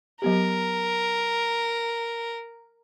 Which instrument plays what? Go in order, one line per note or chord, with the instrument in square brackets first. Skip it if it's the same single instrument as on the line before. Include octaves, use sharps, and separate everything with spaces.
[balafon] F#3 B3 G4 [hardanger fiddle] A#4